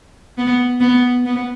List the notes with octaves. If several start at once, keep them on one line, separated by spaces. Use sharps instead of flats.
B3
B3
B3